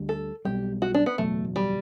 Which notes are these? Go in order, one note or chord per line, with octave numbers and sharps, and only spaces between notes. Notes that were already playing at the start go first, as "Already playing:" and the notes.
Already playing: D2 D3 G3
A4
B1 B2 G3 G4
F#4
D4
B3
F#1 E2 B2 F#3 A3
G3